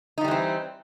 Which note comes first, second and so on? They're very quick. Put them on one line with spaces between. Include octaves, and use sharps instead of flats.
D#4 F3 G3 E3 C4